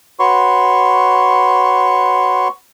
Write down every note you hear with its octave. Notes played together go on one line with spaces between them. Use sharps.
F#4 B4 C#5 C6 C#6